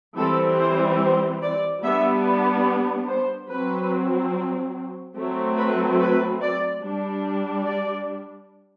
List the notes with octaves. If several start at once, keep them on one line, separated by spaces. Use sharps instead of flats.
E3 G3 C4 A4
C5
C5
D5
G3 B3 D4 E5
D5
C5
F#3 C4 B4
F#3 A3 C4
B4
B4
D5
G3 D4
D5